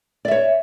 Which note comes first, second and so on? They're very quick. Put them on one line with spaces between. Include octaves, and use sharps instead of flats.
D5 E5 C#5